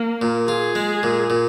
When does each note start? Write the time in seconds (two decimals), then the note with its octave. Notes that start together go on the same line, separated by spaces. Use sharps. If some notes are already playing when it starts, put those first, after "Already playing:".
Already playing: A#3
0.22 A#2
0.48 F4 G#4
0.75 G#3
1.03 A#2
1.30 A#2